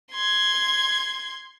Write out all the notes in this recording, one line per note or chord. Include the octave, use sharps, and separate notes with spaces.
C6 G#6